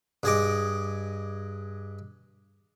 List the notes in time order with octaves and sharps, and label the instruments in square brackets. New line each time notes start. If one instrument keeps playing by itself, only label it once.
[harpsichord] G2 G#4 D#5 D6